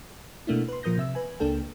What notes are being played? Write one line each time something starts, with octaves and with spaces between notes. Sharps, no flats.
B2 A3 A#3 D4 E4
B4 C6
A#2 F3 A#4 D#6 G6 A#6
C3 E5 E6
B4 G#5
C#2 A#3 D4 A4 G5